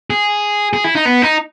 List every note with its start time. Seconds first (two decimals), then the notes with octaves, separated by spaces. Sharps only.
0.10 G#4
0.73 G#4
0.84 E4
0.95 D#4
1.05 B3
1.22 D#4